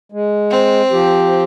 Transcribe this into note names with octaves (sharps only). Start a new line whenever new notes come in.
G#3
C4
F3 G4